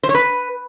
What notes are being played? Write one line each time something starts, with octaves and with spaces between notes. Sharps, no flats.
C5
C#5
B4